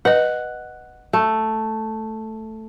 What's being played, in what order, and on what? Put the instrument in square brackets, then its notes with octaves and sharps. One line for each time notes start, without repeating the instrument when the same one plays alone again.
[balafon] B4 D#5 [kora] F#5
[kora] A3